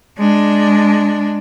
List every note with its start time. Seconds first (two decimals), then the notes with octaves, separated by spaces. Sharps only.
0.18 G#3 D4